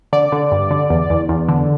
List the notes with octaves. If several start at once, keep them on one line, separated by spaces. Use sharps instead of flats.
D3 D5
D3
G2
D3
E2
E2
E2
D3